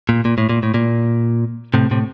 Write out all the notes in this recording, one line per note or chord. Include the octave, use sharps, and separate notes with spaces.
A#2
A#2
A2
A#2
A2
A#2
A2 C3
A2 C3